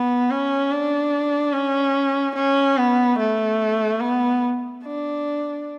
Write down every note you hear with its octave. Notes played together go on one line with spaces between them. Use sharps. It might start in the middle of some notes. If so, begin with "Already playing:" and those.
Already playing: B3
C#4
D4
C#4
C#4
B3
A3
B3
D4